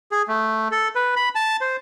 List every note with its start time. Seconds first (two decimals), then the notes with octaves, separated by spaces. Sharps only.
0.12 G#4
0.28 A3
0.71 A4
0.95 B4
1.16 B5
1.35 A5
1.61 C5